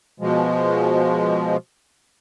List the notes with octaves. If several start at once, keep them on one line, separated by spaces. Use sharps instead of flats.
B2 F3 G#3